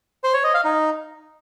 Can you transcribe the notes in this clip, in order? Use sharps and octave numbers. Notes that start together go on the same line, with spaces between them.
C5
C#5
D#5
F5
D#4